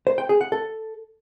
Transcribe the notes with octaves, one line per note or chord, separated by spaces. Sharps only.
C5
G5
G#4
F#5
A4